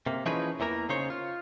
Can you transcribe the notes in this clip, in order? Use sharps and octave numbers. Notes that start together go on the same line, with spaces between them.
C3 A#3
E3 F3 C#4 D#4 G#4 B4
E2 E3 A#3 A#4
C#3 D#4 C5 C#5
F4